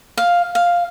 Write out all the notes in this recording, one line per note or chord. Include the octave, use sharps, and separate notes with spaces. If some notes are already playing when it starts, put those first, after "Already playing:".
F5
F5